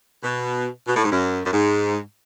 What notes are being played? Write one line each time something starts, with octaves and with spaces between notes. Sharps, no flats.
B2
B2
A2
G#2
F#2
F#2
G#2